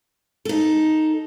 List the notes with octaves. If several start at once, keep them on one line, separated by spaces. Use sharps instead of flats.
D#4 A4